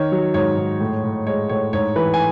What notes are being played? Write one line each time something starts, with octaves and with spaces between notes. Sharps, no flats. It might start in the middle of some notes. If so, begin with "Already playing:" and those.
Already playing: D#3 C#5
F#3
G#2 C#5
G#2
A2
A2
G#3 C#5
A2 C#5
G#2 C#5
E3 B4
G#5